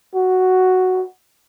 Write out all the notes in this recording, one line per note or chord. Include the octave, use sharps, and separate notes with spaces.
F#4